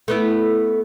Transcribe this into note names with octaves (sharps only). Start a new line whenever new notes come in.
A3 B3 E4